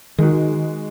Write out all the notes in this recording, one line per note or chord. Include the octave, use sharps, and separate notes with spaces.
D#3 G#3 D#4 F#4